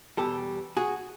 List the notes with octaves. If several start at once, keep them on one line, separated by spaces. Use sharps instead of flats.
E2 B2 G3 G4 A4
F#4 G#4